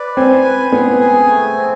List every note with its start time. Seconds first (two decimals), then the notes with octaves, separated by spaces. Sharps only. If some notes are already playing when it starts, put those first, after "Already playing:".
Already playing: B4 D5
0.17 C4 G#5
0.44 B4
0.72 B3 G#4
1.00 G#5
1.28 A3
1.57 C4